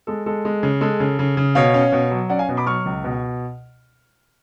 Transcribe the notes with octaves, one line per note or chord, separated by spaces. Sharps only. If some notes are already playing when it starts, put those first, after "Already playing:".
G#3 A4
G#3 A4
G#3
C#3
G#3 A4
C#3
C#3
C#3
B2 C#5 F5
C#4
B2
F#3
C#4 D5 F#5
F5 G#5
B2
B5 D6
F#3 C#6 F6
C#2
B2